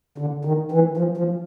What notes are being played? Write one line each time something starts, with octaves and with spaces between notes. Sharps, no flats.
D3
D#3
E3
F3
F3